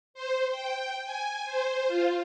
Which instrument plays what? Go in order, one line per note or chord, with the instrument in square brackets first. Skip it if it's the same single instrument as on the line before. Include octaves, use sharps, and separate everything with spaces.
[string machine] C5
G5
G#5
C5
F4